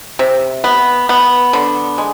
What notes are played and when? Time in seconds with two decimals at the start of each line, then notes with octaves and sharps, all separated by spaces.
0.19 C3
0.64 B3
1.09 B3
1.53 D3
1.98 G#3